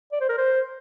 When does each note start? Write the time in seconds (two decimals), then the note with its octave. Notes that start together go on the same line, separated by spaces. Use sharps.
0.12 D5
0.21 C5
0.29 A#4
0.38 C5